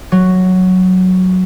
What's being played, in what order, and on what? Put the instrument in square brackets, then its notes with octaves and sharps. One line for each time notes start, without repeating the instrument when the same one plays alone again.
[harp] F#3